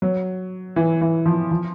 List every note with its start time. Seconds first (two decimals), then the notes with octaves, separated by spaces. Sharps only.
0.02 F#3
0.76 E3
1.01 E3
1.26 F3
1.51 F3